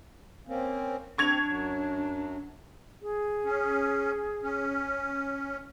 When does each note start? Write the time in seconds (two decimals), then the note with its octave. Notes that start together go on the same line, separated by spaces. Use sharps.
0.47 A#3 C4 C#4
1.18 C4 D4 C#6 G#6 F7
1.46 F#2 F#3
3.02 G#4
3.45 C#4
4.43 C#4